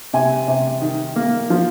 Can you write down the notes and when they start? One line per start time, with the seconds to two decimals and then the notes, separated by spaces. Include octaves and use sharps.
0.14 C3 G#5
0.48 C3
0.82 D#3
1.16 A#3
1.50 F3